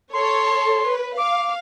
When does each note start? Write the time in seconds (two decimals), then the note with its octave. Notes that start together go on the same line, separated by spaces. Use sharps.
0.13 A4 C#5 C6
0.87 B4
1.18 F5 D6